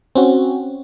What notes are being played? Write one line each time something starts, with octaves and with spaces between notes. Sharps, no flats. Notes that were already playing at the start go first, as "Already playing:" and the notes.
C4 C#4 F#4